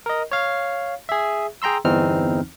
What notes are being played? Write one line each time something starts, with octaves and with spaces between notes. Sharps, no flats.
A#4 D#5
C#5 F5
G#4 E5
G#4 G5 A#5 C6 E6
G1 E2 E3 C4 D#4 F6